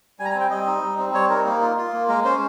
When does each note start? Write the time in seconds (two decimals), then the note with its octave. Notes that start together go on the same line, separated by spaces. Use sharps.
0.20 G3 G#5
0.25 A#5
0.30 G#5
0.35 C4
0.40 G5
0.50 G3 D#5
0.66 D#4
0.83 G3
0.98 C4
1.14 G3 C#5
1.30 D#4 A#4
1.45 A#3
1.61 F4
1.77 F4
1.93 A#3
2.09 G#3 A#4
2.25 C#4 C5